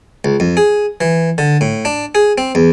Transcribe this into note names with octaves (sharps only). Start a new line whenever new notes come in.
C#2
F2
G#4
E3
D3
A2
D4
G#4
C4
E2